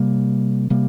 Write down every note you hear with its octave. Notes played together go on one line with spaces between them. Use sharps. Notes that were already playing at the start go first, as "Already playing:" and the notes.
Already playing: C3 G3 A#3
C3 G3 A#3